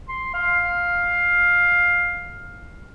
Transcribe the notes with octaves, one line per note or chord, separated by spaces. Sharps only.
C6
F5